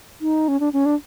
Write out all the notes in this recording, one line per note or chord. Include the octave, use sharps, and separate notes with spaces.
D#4
C#4
D4
C#4
D4